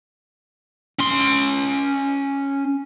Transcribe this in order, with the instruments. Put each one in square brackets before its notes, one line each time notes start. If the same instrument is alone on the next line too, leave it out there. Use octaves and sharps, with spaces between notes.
[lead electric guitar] C#4 C6